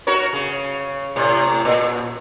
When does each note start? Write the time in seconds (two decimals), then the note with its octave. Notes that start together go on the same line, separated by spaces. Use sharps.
0.07 F#4 A#4 C#5
0.33 C#3
1.16 A2 C3
1.65 A#2